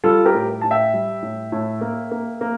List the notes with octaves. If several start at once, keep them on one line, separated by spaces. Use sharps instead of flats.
G3 F4 A4
G4 A#4
A2
A2 A5
E5 G5
G3
A2
A2
A#3
A#3
A#3